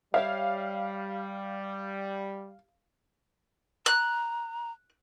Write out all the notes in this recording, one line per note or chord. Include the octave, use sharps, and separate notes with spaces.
G3 G4 C#5 E5 F5
A#5 F#6